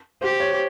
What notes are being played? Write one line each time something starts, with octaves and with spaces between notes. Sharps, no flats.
G4 C5
C#5